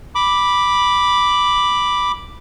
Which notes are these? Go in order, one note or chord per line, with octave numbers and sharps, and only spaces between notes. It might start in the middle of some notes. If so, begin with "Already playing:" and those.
B5 D6